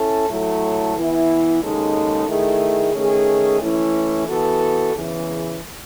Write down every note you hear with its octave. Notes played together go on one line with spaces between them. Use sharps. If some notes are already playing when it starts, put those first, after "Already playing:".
Already playing: C#4 E4 A4
A2 F#3 A3 E4 A4
E3 B3 E4
D#2 C#3 G#3 D#4 A4
D#3 A3 E4 G#4
D#3 A3 C#4 G#4
E3 A3 C#4 E4
E3 B3 F#4 A4
E2 C#3 E3